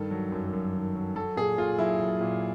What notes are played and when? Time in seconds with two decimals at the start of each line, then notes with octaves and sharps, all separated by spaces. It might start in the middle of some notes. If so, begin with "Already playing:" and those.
Already playing: G2 D#3 A4
0.11 F#3
0.32 F#2
0.53 F#2
0.74 D#3
0.95 F#3
1.15 F#3 A4
1.36 A#2 G#4
1.58 A#2 F4
1.78 F#3 E4
2.00 F#3
2.21 A#2